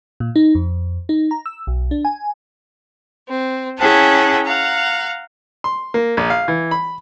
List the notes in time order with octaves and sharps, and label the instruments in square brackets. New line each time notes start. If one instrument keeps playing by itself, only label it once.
[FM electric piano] A#2
D#4
F2
D#4
A#5
E6
B1
D4
G#5
[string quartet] C4
C#4 E4 G#4 F#5 G5 A5
F5 F#5 A#5
[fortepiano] C6
A#3
A#1
F5
E3
B5